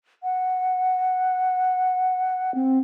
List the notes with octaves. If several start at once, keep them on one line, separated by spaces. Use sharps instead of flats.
F#5
C4